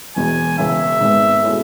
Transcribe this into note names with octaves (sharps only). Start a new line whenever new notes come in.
E1 E2 B2 G#3 G#5
E1 E2 C#3 E5
G#1 G#2 G#3 B3
B2 G#3 C#4 E4 A4